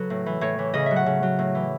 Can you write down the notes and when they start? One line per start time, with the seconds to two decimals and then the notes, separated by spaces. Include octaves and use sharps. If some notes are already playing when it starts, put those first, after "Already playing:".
Already playing: C#3 F#3 A4 B4
0.10 A2
0.26 E3
0.41 A2 C#5
0.58 E3
0.74 C#3 D#5
0.86 F#3 E5
0.96 F#5
1.06 C#3
1.23 F#3
1.39 A2
1.55 E3